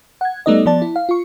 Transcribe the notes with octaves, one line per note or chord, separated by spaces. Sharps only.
F#5 G#6
G3 A3 B3 D#4 D5 D#5
F3 B3 D5 A5
E4
F5
F4 C#6